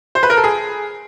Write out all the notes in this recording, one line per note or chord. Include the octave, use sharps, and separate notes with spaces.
C5
B4
A#4
A4
G#4